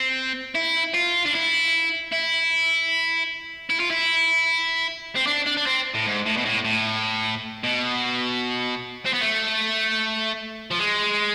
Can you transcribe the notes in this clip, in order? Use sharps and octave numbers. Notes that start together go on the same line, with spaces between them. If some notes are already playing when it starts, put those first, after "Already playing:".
Already playing: C4
E4
F4
D4
E4
E4
E4
F4
E4
C4
D4
D4
D4
C4
A2
G#2
A2
B2
A2
A2
B2
C4
B3
A3
F3
G#3